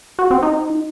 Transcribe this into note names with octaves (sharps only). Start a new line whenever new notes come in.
F#4
C4
D#4